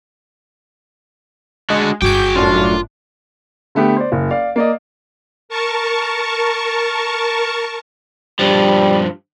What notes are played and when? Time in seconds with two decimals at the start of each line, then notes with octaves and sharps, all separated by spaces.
1.70 G#3 D4 F#4
2.02 G1 F#4 G#4 G5 D6 G6
2.36 F#2 A2 D4 F4
3.75 D3 A3 B3 G4
3.96 C5 D5
4.12 F#1
4.31 D5 F5
4.56 A#3 D5 D#5
5.49 A#4 A5 C#6
8.39 G2 F3 G3